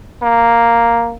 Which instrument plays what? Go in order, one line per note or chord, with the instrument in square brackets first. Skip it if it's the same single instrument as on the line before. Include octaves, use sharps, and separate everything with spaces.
[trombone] A#3